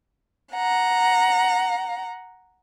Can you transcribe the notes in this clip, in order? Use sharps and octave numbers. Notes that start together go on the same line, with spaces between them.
F#5 A#5